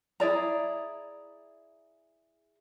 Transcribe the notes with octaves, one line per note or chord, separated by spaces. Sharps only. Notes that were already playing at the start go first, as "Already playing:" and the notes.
E4 G#4 D5 A#5